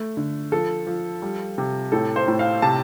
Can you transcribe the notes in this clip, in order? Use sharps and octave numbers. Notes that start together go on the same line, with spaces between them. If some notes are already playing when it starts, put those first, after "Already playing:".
Already playing: A3
D3
F3 A4
F3
G3
C3
A2 A4
C5
A2
F5
C3 A5